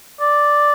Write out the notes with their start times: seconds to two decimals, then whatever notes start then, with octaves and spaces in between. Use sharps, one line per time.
0.21 D5